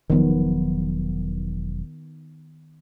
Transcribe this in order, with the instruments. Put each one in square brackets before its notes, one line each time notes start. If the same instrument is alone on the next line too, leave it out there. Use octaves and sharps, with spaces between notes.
[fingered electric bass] E1 F3 F#3 [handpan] D#3 B3